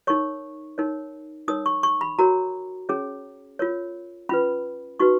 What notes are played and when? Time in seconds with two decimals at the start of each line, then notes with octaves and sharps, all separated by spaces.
0.07 D#4 A#4 C#5 C#6
0.78 D#4 A#4 C#5
1.48 D#4 A#4 C#5 D#6
1.66 C#6
1.83 C#6
2.01 B5
2.19 F#4 A#4 C#5 A#5
2.89 C#4 G#4 C#5
3.59 F4 A#4 C#5
4.29 C#4 F4 B4 B5
4.99 D#4 F#4 B4 C#6